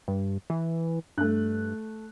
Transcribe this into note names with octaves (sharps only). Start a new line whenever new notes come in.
G2
E3
G2 A3 F#6